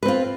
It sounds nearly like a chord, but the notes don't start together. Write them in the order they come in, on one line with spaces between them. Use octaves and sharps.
B4 C4 F4